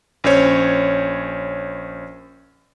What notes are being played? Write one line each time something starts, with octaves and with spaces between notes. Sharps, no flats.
A#1 C#4 C5 C#5